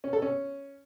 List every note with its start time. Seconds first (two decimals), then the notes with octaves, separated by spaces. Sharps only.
0.04 C#4
0.13 A4
0.22 C#4